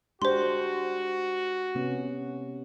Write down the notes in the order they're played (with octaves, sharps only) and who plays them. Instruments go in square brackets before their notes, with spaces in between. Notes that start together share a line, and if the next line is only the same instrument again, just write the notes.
[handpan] G#3 D4 G4 [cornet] F#4 [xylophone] C5 C6
[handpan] C3 B3 C#4